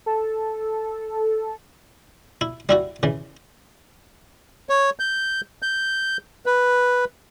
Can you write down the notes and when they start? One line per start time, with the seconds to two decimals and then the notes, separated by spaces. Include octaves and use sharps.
0.06 A4
2.41 E4
2.69 G3 E4 F#4
3.03 C#3 E3
4.69 C#5
4.99 G6
5.62 G6
6.46 B4